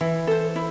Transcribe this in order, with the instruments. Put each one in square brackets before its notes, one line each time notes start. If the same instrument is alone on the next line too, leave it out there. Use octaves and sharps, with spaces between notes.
[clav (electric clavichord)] E3 [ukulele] E4
[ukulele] A4 C5
E4